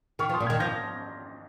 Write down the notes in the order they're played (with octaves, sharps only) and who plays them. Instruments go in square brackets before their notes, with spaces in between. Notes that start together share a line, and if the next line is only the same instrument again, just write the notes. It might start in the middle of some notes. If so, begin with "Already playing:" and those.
[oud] D#3 [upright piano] C#6 F6
[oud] F3
[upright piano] C6 D#6
[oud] A#2
[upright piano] F6 G#6
[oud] D#3
[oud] F3 [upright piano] G6 A#6